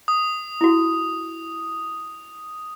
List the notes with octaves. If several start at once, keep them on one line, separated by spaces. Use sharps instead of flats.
D#6
E4 F#4